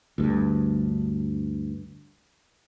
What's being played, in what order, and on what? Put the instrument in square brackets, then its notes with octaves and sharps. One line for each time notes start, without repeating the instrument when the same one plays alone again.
[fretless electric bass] D2 G2